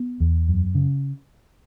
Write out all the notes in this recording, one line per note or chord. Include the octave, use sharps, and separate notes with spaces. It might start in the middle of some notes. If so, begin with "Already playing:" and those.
Already playing: B3
E2
F#2
C#3